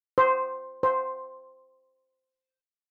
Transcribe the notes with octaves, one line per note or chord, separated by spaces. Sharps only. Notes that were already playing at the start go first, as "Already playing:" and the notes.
C5
C5